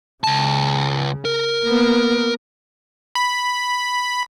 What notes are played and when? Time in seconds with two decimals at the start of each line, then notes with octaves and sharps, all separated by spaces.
0.24 C#2 C#3 A5
1.25 A#4
1.63 A#3 B3
3.15 B5